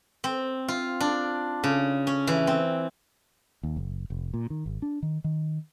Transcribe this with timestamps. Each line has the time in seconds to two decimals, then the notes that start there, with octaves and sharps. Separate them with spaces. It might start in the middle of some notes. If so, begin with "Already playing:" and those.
0.24 C4
0.68 F4
1.01 D4
1.64 C#3
2.07 C#4
2.27 E3
2.47 C4
3.63 D#2
3.77 F#1
4.10 F1
4.34 A#2
4.50 D#3
4.66 G#1
4.82 D4
5.02 D#3
5.24 D#3